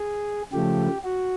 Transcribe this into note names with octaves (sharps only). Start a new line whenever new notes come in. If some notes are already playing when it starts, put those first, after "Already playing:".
Already playing: G#4
C#3 F3 A3 G4
F#4